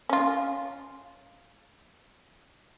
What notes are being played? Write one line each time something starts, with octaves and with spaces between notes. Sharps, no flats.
C#4 F4